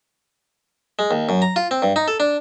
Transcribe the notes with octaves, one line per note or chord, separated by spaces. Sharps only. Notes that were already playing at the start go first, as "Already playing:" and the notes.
G#3
D#2
F#2
A#5
F4
C4
G2
D#4
A4
D4